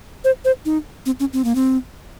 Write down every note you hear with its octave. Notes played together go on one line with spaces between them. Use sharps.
C5
C5
D#4
C4
C#4
C4
A#3
C4